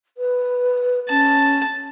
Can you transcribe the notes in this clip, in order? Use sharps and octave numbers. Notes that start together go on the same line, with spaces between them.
B4
C#4 A5